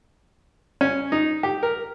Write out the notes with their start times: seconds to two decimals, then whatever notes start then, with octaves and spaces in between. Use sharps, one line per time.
0.81 C#4
1.12 D#4
1.43 G4
1.63 A#4